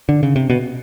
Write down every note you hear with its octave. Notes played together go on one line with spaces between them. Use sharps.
D3
C#3
C3
B2